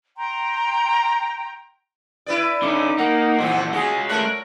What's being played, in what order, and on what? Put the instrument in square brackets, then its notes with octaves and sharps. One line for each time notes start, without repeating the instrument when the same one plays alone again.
[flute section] G5 A#5 C6
[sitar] E4 B4 D5
[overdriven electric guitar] D3 C#4 [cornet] D#4 [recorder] D6
[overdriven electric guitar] A#3 [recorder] F#5
[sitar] F2 C4 [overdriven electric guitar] A#2 E3
[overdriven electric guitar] G#3 F4 [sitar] F#4 [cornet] G#4
[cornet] A3 [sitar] A#4 C#5 [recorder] F#6